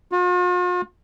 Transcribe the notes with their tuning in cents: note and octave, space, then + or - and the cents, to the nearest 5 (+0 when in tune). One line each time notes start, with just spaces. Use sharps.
F4 +45